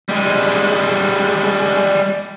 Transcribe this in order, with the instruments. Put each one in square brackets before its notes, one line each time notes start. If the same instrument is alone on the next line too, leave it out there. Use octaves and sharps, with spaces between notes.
[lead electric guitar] G3 G#3